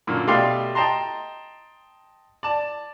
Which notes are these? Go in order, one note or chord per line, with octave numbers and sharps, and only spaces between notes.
F#2 A#2 D3
B2 A3 G4 D5 F5 C6
D#5 G5 A5 A#5 C6
D5 A5